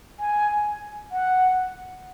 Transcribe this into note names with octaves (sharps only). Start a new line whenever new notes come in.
G#5
F#5